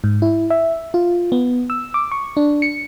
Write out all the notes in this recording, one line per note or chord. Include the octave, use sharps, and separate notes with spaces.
G#2
E4
E5
F4
B3
E6
D6
C#6
D4
C#7